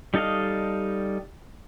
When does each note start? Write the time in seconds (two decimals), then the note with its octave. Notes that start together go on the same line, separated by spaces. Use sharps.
0.14 G3 D#4 A4 D#5 F5